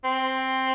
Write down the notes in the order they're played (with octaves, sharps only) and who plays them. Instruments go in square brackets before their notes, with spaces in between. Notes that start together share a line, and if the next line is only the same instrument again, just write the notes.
[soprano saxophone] C4